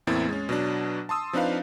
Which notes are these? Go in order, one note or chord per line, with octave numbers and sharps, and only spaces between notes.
E2 A2 A#3 C4 E4 A6
G#3 C#4
B2 F#3 D4
A5 C6 D#6 E6
F3 C4 D4 D#4 B4 F5